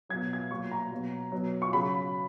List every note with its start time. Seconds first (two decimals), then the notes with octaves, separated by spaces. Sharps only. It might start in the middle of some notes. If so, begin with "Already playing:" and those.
0.09 B2 F#3 G#6
0.33 G#6
0.51 A#2 F#3 C#6
0.71 A#5
0.92 B2 F#3
1.32 B2 F#3
1.62 C#6
1.73 C#3 F#3 B5